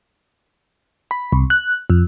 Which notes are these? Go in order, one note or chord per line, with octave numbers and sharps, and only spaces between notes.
B5
C2
F#6
F2